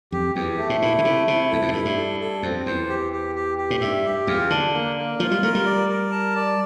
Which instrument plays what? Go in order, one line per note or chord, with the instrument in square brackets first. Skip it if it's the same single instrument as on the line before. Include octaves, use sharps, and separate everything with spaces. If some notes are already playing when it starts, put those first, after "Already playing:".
[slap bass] F2 [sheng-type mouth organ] G4
[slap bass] E2 [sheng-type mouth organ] G4
[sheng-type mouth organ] A3
[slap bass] A2
[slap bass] A#2 [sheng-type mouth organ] E4
[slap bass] D3
[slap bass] C3 [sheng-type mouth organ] A3
[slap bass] C3 [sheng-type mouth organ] E4
[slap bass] E2 [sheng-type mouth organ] A4
[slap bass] F2
A2
[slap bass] G2 [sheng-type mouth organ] E4
[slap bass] G2
[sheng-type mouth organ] A4
A4
[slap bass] F2 [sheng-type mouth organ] C4
[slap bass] E2 [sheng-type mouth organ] C5
[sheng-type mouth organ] G4
G4
G4
G4
[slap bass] A2
[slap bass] G2 [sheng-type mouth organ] E5
[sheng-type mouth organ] G4
[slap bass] E2 [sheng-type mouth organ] F4
[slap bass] D3 [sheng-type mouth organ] D4
[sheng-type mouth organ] A#3
A#3
[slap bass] F3 [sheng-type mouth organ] F4
[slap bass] G3
[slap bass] A3 [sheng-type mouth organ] A#4
[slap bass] G3
[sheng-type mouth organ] D5
A#4
A5
D5